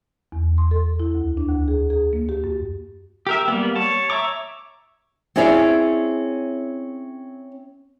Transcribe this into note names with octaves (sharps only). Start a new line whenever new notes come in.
E2
C6
A4
E4
D2
D4
D2
G#4
G#4
A#3
G4
F#2
G4 A#4 E5
G3 A#3 B3
C#5 A5
C#5 E5 A#5 C#6 D6
C4 C#4 E4 G#4 C#5 D5